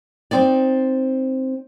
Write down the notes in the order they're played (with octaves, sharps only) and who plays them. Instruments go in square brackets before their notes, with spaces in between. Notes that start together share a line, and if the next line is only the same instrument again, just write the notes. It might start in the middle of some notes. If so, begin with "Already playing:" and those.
[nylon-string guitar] C4 D#4 D5